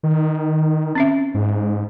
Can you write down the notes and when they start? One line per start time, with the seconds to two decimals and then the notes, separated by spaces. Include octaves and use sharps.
0.03 D#3
0.95 C4 C#4 E5
1.34 G#2